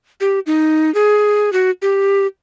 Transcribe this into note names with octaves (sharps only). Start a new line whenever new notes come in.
G4
D#4
G#4
F#4
G4